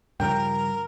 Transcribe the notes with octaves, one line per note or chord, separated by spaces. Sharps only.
G2 C#3 F3 A#4 G5